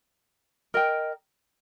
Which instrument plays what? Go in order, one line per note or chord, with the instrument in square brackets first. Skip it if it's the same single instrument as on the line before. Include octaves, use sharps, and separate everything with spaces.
[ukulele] A#4 D#5 G5